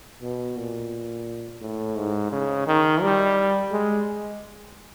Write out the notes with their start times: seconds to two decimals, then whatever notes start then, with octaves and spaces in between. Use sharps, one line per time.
0.22 B2
0.56 A#2
1.61 A2
1.96 G#2
2.32 C#3
2.67 D#3
3.02 G3
3.72 G#3